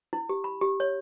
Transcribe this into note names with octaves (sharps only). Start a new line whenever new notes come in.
E4
G4
B5
G4
C#5